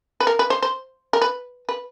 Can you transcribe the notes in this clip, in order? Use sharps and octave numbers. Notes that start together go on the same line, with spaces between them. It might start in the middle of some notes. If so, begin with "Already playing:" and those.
B4
A#4
B4
C5
C5
A#4
B4
B4